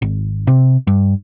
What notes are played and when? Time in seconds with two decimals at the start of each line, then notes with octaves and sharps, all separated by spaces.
0.02 G#1
0.47 C3
0.87 G2